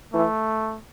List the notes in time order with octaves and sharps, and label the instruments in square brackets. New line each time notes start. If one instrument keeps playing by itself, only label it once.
[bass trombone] E3 [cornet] A3